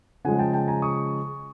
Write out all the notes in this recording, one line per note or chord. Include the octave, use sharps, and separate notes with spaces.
C#3 F3 G#3 F#5 G#5
G5 A5
G5 A5
G#5 A#5
C#6 D#6